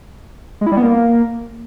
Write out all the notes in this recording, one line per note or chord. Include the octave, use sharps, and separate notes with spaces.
G#3
E4
G3
B3
A#3